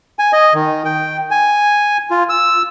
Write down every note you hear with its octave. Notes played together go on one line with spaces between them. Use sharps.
G#5
D#5
D#3
G5
G#5
F4
E6